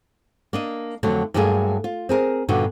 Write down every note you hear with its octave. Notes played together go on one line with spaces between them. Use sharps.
A#3 D4 D#5
F2 D3 F#3 A3
G2 F#3 A3 A#3 G#4 A#4
F4
C4 G#4 A#4
G2 A#2 D3 B3 F#4